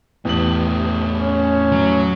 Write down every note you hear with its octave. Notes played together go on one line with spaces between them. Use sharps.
E2 A2 G4 F#7
C#4
F#3